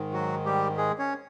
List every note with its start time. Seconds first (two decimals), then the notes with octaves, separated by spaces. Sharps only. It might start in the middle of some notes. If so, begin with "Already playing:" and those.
Already playing: G#2 D#3
0.13 F#3 F#4
0.45 G3 G4
0.77 G#3 G#4
0.98 C#4 C#5